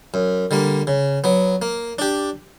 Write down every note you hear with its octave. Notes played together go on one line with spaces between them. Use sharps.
F#2
D3 G3 A#3
C#3
F#3 B3
A#3
D4 G4